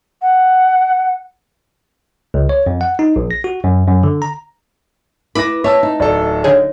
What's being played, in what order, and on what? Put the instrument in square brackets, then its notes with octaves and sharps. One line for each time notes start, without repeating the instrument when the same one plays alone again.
[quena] F#5
[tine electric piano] C#2
C#5
F2
F#5
D#4
A#1
A#6
F#4
F#2
F#2
D3
A#5
[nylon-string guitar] E4 B4 [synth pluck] B5 [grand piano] D6 A#6
[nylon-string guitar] C#5 [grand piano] E5 A5 E6
[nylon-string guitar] D#4
[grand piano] D1 A4 [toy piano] D5 A#5
[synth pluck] D3 G#4 [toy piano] C#5